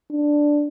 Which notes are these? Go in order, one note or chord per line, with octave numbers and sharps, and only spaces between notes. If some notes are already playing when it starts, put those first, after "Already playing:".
D4